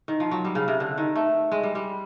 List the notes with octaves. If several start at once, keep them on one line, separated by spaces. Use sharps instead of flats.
D#3
F3
F#3
G3
C#3
C3
D3
D#3
A3
G#3
G3
G3